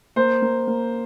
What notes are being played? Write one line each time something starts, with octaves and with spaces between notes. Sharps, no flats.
A#3 C5
A#3
A#3